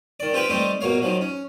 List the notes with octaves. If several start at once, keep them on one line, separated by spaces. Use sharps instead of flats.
D#3 D5
C4 F4 G4 B4 G5
G3 A3 C4 D#4 G4
A#1 B2 A#3 C#5 F5
D#3 F3 F#3
C#4